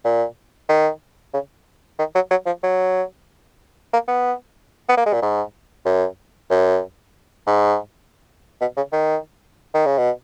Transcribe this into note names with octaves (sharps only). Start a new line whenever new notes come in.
A#2
D#3
C#3
D#3
F#3
F#3
F3
F#3
A#3
B3
B3
A#3
G#3
A#2
G#2
F#2
F#2
G#2
B2
C#3
D#3
D#3
C#3
B2